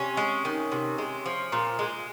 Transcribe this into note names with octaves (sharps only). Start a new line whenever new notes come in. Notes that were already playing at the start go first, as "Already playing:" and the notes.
Already playing: C3 C#4
G#3
D#3
C3
G#3
F3
A#2
G#3